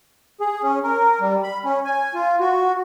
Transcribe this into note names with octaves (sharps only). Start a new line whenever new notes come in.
G#4
C#4
A#4
G3
B5
C#4
G#5
F4
F#4